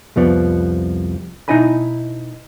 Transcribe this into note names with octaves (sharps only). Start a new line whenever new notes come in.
C2 F2 F3 B3 D5
B2 D#4 E4 D#5 G#5 B5